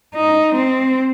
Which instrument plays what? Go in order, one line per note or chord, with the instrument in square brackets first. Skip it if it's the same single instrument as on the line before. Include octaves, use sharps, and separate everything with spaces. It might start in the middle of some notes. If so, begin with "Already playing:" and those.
[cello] D#4
C4